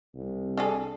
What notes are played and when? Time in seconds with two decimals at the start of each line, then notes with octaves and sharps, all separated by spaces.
0.15 C2
0.57 D4 G#4 A4